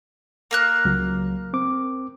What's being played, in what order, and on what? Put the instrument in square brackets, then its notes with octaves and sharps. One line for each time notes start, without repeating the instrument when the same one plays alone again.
[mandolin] A#3 A#4 F#6
[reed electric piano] C#2 F#3
C4 D6